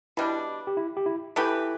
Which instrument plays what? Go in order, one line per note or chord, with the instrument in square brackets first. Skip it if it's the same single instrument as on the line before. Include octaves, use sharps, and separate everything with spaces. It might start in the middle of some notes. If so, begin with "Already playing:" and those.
[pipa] B2 G3 D4 [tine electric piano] E4
[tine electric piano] G4
E4
G4
E4
[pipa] E3 A3 G4 B4 [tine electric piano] E4